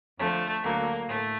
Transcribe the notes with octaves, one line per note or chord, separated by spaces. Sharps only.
F2 D3 F3 A3
D2 D3 F#3 A#3
A2 A3